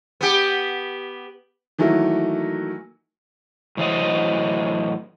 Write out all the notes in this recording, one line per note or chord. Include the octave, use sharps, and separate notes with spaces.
B3 G4
D#3 E3 F#3 A3 A#3
A2 E3 F#3 C5 D#5